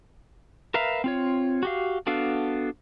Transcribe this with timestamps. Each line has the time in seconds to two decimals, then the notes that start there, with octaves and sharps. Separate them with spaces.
0.74 A#4 B4 E5 F5 A#5
1.04 C4 F4 C#5
1.63 F#4 G4 F5
2.07 B3 D4 F#4 A4 F5